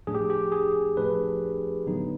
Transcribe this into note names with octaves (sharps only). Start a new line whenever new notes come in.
A2 F3 A3 D4 G#4
G4
G4
G#4
A2 F3 A3 D4 B4
D3 F#3 B3 D#4